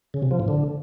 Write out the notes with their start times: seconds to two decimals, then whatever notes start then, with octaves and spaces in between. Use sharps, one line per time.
0.14 C#3
0.23 C3
0.31 F3
0.39 A2
0.48 D3